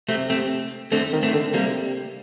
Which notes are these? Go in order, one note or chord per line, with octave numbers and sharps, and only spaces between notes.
C3 A3 C4
A3 C4
D3 A3 C4
D#3
A3 C4
D3
C3 G3 A#3